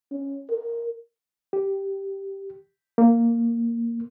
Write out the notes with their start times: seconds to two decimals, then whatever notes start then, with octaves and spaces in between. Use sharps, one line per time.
0.12 C#4
0.50 A#4
1.53 G4
2.98 A#3